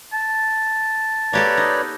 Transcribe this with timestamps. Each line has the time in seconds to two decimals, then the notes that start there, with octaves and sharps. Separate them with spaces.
0.13 A5
1.33 A#3 G4 A4 B4 C#5 D5
1.57 D#4